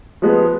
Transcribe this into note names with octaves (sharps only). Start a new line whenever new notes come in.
F3 G#3 B3